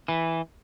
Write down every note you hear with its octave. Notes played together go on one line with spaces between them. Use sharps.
E3